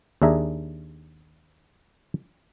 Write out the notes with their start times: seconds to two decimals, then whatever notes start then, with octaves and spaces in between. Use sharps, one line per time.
0.22 D#2 D4 G#4 E5 A#5